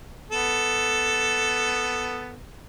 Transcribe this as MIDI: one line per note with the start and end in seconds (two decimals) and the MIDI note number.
0.31 2.41 59
0.31 2.41 69